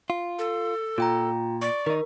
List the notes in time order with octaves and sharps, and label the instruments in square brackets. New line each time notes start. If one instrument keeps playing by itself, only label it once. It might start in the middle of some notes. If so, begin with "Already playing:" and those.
[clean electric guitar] F4
[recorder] A4
[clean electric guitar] A#2 [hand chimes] F4 G5 A#5
[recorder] D5 [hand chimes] C#6
[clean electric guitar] D#3 D#4 [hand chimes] A#4